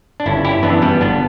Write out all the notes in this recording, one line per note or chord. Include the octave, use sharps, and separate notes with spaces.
D4
G1 C#4 E4
E4 G4
F#2 E3 B3 D4
G3 B3
G1 B3 D4